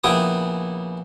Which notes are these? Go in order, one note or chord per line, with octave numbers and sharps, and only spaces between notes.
A#1 C#3 B3 E4 G5 D#6